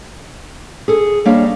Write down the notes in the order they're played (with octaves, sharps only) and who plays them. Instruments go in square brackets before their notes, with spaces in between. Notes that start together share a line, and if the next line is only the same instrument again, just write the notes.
[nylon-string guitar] G#4 A4
G3 A#3 D4 C#5 D#5 F5